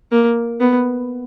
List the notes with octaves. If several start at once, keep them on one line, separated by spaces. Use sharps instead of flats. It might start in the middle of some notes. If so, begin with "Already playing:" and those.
A#3
B3